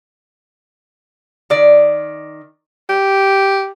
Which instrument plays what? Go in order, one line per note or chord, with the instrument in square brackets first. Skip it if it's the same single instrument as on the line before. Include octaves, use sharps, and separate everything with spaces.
[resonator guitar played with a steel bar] D#3 D5
[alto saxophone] G4